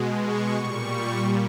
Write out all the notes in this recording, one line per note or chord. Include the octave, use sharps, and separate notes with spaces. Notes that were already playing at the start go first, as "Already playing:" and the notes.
Already playing: B2 G#3
C#6
A#2 G3 C#6